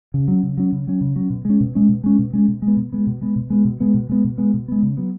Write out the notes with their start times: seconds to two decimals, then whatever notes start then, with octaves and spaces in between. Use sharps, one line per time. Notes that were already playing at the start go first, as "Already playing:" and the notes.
0.14 C#3
0.28 F#3 C#4
0.43 C#3
0.57 F#3 C#4
0.72 C#3
0.87 F#3 C#4
1.01 C#3
1.16 F#3 C#4
1.30 B2
1.45 G#3 C#4
1.61 B2
1.75 G#3 C#4
1.89 B2
2.04 G#3 C#4
2.19 B2
2.33 G#3 C#4
2.48 B2
2.62 G#3
2.68 B3
2.77 B2
2.93 G#3 B3
3.07 B2
3.21 G#3 B3
3.36 B2
3.50 G#3 B3
3.65 B2
3.80 G#3 B3
3.94 B2
4.09 G#3 B3
4.24 B2
4.38 G#3 B3
4.54 B2
4.68 G#3 B3
4.83 C#3
4.97 F#3 B3